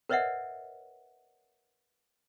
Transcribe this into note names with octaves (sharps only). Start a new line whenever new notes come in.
A#4 B4 C#5 D#5 E5 F#5